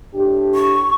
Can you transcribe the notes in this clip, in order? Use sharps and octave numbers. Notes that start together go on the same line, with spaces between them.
A2 D4 G4
C#6